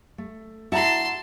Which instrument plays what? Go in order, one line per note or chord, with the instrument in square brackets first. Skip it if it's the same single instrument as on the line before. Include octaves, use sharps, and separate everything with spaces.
[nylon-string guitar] A3
[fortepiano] E4 A#5 [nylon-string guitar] F#4 [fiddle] A5 C6